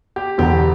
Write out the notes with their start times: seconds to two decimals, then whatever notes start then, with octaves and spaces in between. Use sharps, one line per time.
0.16 G4
0.38 E1 E2 D3 G4